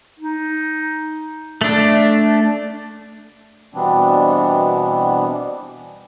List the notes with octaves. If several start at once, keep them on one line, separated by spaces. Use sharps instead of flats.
D#4
A3 D4
B2 E3 G3 B3 C4 D4